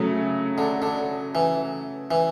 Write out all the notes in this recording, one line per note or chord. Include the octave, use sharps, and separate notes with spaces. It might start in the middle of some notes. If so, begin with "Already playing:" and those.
Already playing: C#3 F#3 A3
D3
D3
E3
E3